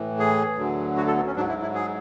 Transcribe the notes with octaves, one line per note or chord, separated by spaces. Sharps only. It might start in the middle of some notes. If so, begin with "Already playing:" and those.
Already playing: A2 E3
G#4
D2 D3 F#3
F#4
A4
B3
C#4
G#2 F#3 D4
E4
E4
G#4